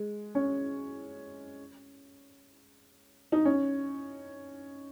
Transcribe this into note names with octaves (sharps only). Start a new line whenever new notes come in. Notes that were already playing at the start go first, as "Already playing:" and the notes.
Already playing: G#3
C#4
D#4
C#4